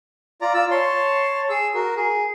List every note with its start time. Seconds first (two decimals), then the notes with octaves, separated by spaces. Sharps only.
0.41 F4 D5 A#5
0.54 F4 E6
0.71 C#5 A5 C6
1.49 G#4 E6
1.74 F#4 A#4
1.96 G#4